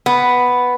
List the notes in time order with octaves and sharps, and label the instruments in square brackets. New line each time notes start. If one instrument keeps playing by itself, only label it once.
[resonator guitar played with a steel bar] B3